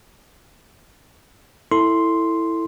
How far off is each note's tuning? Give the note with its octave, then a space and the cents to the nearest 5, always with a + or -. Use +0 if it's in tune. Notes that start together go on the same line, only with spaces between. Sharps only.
E4 +0 A4 +15 C6 +0